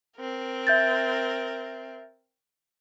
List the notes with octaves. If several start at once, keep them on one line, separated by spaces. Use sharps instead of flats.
C4 A#4
E5 G6 A6